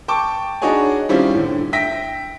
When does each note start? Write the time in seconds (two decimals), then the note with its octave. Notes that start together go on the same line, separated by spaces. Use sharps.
0.08 G5 A5 C#6 D6
0.62 D4 D#4 F#4 G#4 C#5 G#5
1.09 D#3 G3 C4 C#4 E4 F4
1.34 A2 D3
1.73 E5 G5 A#6 B6